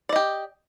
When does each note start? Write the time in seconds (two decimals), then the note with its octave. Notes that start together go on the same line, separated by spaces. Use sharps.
0.09 D5
0.13 D#5
0.16 G4